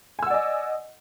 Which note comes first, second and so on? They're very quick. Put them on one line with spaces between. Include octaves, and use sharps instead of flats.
G#5 E6 F#5 D5 D#5